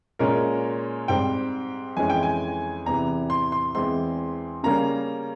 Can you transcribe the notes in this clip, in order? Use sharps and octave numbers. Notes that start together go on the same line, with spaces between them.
A#2 G#3 C#4 A#4
G#2 G3 C4 G5
F2 E3 G#3 C#4 G#5
G5
G#5
E2 C3 E3 A#5
C6
C6
E2 E3 G#3 C4 C6
C#3 G3 A#3 C#4 A#5